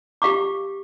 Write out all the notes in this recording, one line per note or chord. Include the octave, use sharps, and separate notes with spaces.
G4 F5 C#6 D6